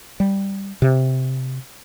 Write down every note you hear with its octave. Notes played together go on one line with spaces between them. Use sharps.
G3
C3